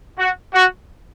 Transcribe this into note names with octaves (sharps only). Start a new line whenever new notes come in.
F#4
F#4